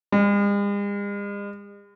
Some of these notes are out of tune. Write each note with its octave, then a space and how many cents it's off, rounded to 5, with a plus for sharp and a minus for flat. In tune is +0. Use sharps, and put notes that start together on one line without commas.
G#3 -45